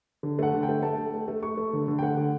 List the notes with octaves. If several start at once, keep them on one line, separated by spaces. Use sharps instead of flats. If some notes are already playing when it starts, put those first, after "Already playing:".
D3
A3 F#5
D3
G5
A3
A3 A5
A3
A3
A3
A3 C#6
A3
D3
D3
G5
A3 F#5
D3